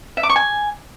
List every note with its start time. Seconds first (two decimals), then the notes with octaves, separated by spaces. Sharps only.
0.17 E5
0.23 D6
0.29 C#6
0.36 G#5